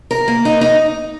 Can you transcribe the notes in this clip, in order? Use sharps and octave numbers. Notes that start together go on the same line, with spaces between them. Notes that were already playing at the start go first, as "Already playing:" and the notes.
A#4
A#3
D#4
D#4